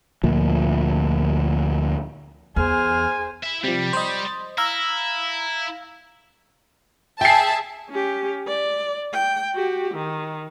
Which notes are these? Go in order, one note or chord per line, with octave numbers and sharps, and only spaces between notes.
D2 A#2 F3
E2 G#4 C5 G#5 F6
E4 E5
C3 F3 G3
C5 D#5
E4 F5 A#5 E6
G#4 E5 G5 A5 C7
C#4 G4
D5
G5
F#4 G4
D#3